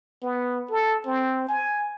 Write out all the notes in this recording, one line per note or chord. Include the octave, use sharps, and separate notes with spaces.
B3
A4
C4
G#5